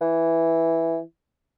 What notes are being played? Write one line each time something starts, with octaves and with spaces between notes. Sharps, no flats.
E3